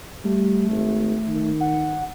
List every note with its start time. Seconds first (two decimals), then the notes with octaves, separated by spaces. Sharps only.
0.24 G3 A3
0.71 G#1
1.28 D#3
1.60 F#5